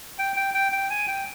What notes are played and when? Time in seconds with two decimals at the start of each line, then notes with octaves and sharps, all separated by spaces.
0.18 G5
0.36 G5
0.54 G5
0.72 G5
0.90 G#5
1.08 G5